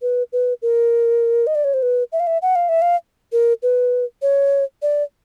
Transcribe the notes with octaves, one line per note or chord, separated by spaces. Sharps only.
B4
B4
A#4
D#5
D5
C#5
C5
B4
E5
F5
E5
F#5
F5
E5
F5
A#4
B4
C#5
D5